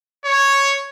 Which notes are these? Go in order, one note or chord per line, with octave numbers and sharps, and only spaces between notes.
C#5